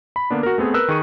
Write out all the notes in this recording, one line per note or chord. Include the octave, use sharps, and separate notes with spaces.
B5
D3 A#3 B3 D4
F#4 A#4
A3 B3 C4 G#4
A#4 B4 E6 F#6
D#3 G#4 C#6 D#7